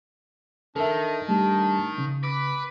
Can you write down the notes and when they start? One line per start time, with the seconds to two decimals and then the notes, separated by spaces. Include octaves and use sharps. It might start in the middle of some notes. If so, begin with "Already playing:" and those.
0.76 D#3 D4 A4 A#4 E5
1.28 G3 A3 D4 G4
1.98 C#3
2.23 B4 D6